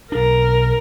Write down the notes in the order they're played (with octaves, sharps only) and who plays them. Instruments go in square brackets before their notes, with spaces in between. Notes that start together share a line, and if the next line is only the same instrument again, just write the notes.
[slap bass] B1 D4 [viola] A#4